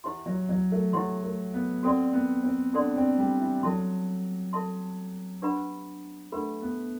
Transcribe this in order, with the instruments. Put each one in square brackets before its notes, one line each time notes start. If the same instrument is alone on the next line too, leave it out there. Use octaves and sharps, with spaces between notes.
[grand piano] E3 [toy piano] E4 G4 C5 F#5 C6
[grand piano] F#3
F#3
A3
[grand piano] F#3 [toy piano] E4 G4 C5 F#5 C6
[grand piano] A3
B3
[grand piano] C4 [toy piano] F#4 A4 D5 F#5 C6
[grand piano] B3
C4
[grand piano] D4 [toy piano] F#4 A4 D5 F#5 C6
[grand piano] C4
G3
E3
[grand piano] F#3 [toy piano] A4 E5 A5 C6
[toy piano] A4 E5 A5 C6
D4 G4 B4 F#5 B5
[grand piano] A3 [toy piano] D4 G4 B4 F#5 B5
[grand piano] B3